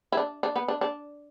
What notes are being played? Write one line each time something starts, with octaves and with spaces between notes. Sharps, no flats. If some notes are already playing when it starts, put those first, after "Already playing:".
E4
D4
D4
B3
D4
D4